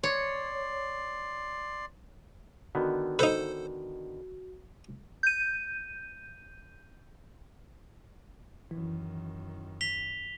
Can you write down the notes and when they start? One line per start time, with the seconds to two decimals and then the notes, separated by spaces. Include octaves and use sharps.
0.03 C#5 D5 C6
2.75 D3 D#3 B3 F#4
3.19 D#4 A4 B4 C5
5.23 G6 D#7
8.71 F#2 D#3 E3
9.81 B6 F7 G7